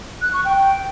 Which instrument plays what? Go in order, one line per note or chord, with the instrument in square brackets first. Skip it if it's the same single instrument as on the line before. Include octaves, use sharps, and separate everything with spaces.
[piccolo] F#6
C#6
G5